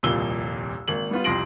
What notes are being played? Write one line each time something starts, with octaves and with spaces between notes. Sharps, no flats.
D#1 C2 F2 A#2 E6 G7
G#1 A#3 F#7
G3 B3 F4
C2 F2 C6 A#6 D7 F#7